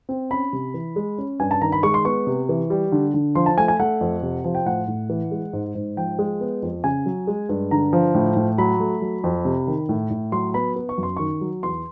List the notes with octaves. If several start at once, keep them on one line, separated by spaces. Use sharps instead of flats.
C4
C#4 B5
C3
E3
G#3
C#4
G2 G#5
A5
D#3 A#5
B5
G#3 C#6
C6
B3 C#6
C3
E3
G3
D3
D3
F3 C6
A5
A3 G#5
G#5
A3 F#5
F2
C3
F3
G5
A2 F#5
A2
E3
G#3
G#2
G#2
F3 G5
G#3
B3
F2
C#3 G#5
F#3
G#3
G2
D3 A#5
F3
A2
A2
F#3 B5
A3
F#3
F2
C3
D#3
A2
A2
F#3 C6
B3 B5
B3
C#6
F#2
C6
D#3 C#6
F#3
E2 C6